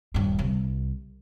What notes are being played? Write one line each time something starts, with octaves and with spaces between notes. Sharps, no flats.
D#1 G2
C2